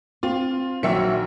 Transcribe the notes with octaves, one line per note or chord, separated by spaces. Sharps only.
C4 F4
A#1 D#3 F#3 E5 C#7